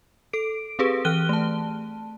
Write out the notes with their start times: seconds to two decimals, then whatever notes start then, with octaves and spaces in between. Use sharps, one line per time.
0.33 A4 D7
0.79 C4 G4 G#4 B4
1.05 E3 F6 F#6 D#7 G7
1.29 A3 A5